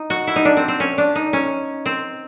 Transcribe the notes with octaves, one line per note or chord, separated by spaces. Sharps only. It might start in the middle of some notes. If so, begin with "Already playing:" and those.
Already playing: D#4
F#4
E4
D#4
D4
C4
C4
C#4
D4
D#4
C#4
C4